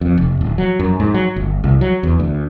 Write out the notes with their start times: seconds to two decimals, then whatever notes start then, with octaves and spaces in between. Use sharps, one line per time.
0.01 F2
0.17 F1
0.41 D1
0.58 F#3
0.79 F#2
1.00 G#2
1.14 F#3
1.36 G1
1.64 C2
1.81 F#3
2.03 E2
2.20 D2